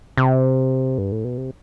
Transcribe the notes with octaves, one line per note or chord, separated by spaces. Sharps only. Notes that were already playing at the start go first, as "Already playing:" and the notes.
C3
G2
A2
B2
C3